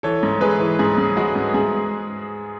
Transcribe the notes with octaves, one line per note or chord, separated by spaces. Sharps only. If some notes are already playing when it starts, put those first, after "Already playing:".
E3 A4 C#5
G#2
G#3 G#4 B4
E3
G#2 G#4
G#2
G#3 F#4
G#2
G#2 G#4